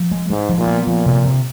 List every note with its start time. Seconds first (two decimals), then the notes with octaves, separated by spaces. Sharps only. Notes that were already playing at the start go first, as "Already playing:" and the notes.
Already playing: F3
0.11 G#3
0.30 G#2 G#3
0.49 F3
0.58 A#2
0.67 B3
0.87 A#2 F3
1.06 C3
1.25 C3